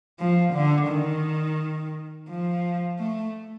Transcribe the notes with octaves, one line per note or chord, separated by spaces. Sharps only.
F3
D3
D#3
F3
A3